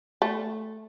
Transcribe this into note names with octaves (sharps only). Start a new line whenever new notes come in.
A3